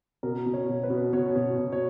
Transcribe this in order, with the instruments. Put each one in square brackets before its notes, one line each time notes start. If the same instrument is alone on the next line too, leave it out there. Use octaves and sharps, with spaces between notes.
[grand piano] B2 A#4
B2
C#5
B2
B4
B2
B2 C#5
B2
B2
C#5